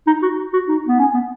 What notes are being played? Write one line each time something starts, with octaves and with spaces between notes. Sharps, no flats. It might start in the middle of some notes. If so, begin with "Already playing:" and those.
D#4
F#4
F#4
D#4
B3
C#4
B3